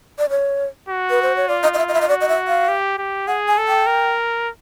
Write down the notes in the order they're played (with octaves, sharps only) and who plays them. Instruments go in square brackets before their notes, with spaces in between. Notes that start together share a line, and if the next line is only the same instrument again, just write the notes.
[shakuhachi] D5
C#5
[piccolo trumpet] F#4
[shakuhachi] B4
C5
C#5
[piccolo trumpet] F4 [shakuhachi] D5
[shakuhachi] D#5
D#5
E5
D#5
E5
D#5
[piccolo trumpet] F#4 [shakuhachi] D5
[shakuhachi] D#5
E5
F5
[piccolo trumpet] G4
G4
[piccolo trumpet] G#4 [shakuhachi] F#5
[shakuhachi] G#5
[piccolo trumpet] A4
[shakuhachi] G5
[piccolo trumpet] A#4